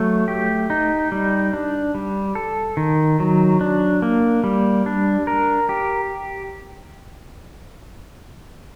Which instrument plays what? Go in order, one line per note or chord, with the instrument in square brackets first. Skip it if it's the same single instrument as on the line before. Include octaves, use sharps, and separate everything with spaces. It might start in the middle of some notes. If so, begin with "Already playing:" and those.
Already playing: [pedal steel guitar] F#3 A3
G4
D#4
G3
D4
G3
A4
D#3
F#3
D4
A#3
G3
D4
A#4
G4